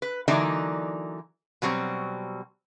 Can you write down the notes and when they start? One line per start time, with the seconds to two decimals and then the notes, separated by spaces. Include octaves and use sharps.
0.02 B4
0.28 D3 E3 F#3 A#3 D#4 D5
1.62 B2 F#3 G3 C4